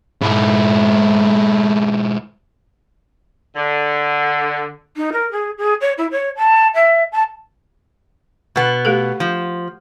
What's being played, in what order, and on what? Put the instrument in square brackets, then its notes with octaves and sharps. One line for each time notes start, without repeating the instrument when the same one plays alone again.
[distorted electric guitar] G#2 E4
[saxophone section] D3
[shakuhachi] D#4
A#4
G#4
G#4
C#5
E4
C#5
A5
E5
A5
[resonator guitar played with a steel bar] B2 B3
[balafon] A3 G4 A4
[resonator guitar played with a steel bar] F3